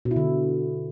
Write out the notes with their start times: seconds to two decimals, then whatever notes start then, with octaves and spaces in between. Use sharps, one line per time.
0.05 B2
0.11 E4
0.16 D3